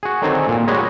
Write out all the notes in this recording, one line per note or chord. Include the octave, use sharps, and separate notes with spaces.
F#4 G#4
D3 D#3 F#3 C4 G#4 A4
A#2
G3 G#3 F#4 G#4 C#5 D#5